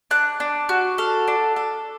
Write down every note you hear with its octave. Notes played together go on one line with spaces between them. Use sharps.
D4 F#6
D4
F#4
A4 F6
D4
A4